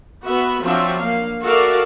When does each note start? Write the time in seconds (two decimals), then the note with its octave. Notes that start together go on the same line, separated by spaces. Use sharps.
0.24 B3 F#4 B4 E5
0.62 F3 F#3 C4 D4 F4 E5
0.99 A#3 F5
1.42 F#4 A4 A#4 D5 E5 F5